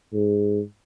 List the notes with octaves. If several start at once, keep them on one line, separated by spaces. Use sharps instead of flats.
G#2